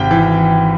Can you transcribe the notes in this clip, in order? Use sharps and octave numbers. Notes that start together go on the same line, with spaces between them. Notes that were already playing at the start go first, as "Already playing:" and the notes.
Already playing: G#1 C3 G5
E3